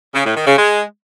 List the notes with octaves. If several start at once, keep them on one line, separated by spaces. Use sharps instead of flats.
C#3
A2
D#3
C#3
G#3